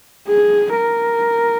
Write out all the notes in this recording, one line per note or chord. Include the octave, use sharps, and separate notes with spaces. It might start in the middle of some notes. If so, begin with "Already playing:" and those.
G#4
A#4